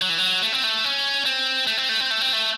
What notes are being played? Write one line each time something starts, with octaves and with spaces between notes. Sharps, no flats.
F#3
E3
F#3
A3
C4
A3
C#4
C4
A3
C4
A3
C4
A3
C4
A3